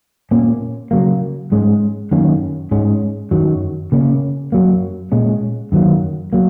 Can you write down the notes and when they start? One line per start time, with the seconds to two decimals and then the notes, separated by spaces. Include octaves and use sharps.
0.31 A#2 A#3 C#4
0.91 C#3 F#3 A#3
1.52 G#2 G#3 C#4
2.11 F#2 D#3 A#3 C#4
2.71 G#2 G#3 C#4
3.31 F#2 D#3 F#3
3.92 C#3 A#3 C#4
4.52 F#2 F#3 A#3
5.12 A#2 G#3 C#4
5.72 F#2 D#3 F#3 A#3
6.33 F#3 A#3